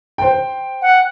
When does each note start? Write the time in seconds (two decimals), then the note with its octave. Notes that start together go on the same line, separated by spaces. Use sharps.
0.18 C5 G5
0.82 F#5